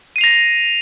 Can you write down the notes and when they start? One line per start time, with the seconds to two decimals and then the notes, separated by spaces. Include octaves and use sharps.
0.16 D#7
0.18 C7
0.21 F7
0.24 A#6